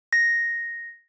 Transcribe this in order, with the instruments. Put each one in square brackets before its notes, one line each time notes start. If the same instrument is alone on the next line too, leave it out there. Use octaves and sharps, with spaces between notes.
[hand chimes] A#6